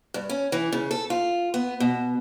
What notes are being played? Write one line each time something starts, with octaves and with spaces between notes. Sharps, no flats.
G2
C#4
E3
C#3
A4
F4
B3
B2